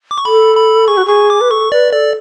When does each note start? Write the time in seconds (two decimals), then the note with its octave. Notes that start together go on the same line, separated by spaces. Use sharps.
0.11 D6
0.18 C#6
0.25 A4 B5
0.57 B5
0.88 G#4 C#6
0.97 F#4
1.06 G#4 C#6
1.30 D6
1.41 B4
1.51 A4 C#6
1.72 B4 D5
1.93 A4 D5